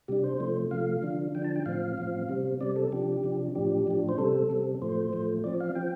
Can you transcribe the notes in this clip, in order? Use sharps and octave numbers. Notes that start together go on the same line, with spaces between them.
C3 G3 D4 G4
C5
C3 F3 A3
C3 F3 A3 F5
D3 F3 D4
D3 F3 D4 G5
A5
G5
A2 F3 C4 F5
A2 F3 C4
C3 G3 C4
C3 G3 C4 D5
A4
C3 F3 D4 G4
C3 F3 D4
A2 F3 D4 G4
A2 F3 D4
C5
C3 G3 C4 A4
C3 G3 C4
A2 F3 A3 C5
A2 F3 A3
F3 C4 D5
F5
F3 C4 G5